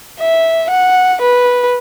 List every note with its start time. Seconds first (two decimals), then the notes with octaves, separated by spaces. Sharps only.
0.21 E5
0.71 F#5
1.22 B4